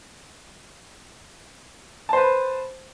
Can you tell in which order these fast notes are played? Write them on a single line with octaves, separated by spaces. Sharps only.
A5 C5 B4